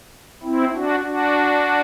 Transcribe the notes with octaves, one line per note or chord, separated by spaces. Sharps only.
C4 E4
D4 F#4
D4 F#4